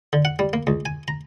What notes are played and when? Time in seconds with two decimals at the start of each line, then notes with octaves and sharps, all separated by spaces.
0.13 D3
0.25 F#5
0.39 G3
0.53 A#3
0.67 C#2
0.86 G#5
1.08 A#5